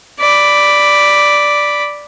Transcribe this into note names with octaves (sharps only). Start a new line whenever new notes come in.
D5 B5